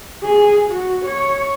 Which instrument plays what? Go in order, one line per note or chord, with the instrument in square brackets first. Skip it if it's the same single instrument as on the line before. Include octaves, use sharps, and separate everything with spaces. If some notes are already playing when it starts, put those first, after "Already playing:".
[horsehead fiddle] G#4
F#4
C#5